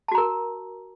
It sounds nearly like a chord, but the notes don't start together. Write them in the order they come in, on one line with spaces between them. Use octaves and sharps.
A5 F#4 A#5 A#4